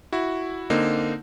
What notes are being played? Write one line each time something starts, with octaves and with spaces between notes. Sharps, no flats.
E4 F#4
D3 A#3 C4 D#4